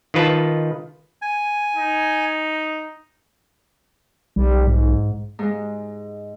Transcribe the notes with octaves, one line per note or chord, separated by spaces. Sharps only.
D#3 F4 B4 A5
G#5
D#4
B1 G3
G#2
G#2 G#3